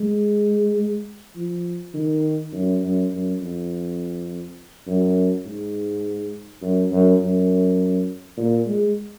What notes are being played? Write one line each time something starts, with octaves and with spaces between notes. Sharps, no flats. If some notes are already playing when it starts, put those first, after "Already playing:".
Already playing: G#3
F3
D#3
F#2
F#2
F#2
F2
F#2
G#2
F#2
F#2
F#2
A#2
G#3